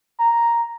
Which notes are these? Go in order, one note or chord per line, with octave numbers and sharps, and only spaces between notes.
A#5